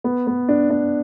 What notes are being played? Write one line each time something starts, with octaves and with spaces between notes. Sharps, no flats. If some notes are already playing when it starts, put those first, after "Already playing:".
B3
B3
D4
D4